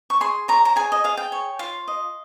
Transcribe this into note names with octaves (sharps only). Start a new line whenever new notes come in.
C#6
G#4 C6
C#5 A#5
A#5
G#4 G#5
D#5
G#4 F5
G5
C#5
F4 F5
D#5